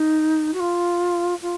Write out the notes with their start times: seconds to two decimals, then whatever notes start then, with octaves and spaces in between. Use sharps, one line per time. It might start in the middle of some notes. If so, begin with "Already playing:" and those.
Already playing: D#4
0.53 F#4
0.59 F4
1.42 F4